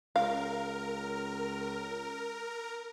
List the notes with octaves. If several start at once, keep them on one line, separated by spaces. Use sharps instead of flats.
C#2 A#4 F5